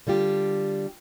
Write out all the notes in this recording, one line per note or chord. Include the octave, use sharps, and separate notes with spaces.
D3 G3 F4 G4